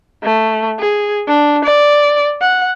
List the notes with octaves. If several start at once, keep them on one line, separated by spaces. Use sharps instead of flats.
A3
G#4
D4
D5
F#5